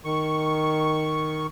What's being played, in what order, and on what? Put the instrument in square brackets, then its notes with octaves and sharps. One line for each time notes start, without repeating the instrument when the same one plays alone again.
[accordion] D#3 C#6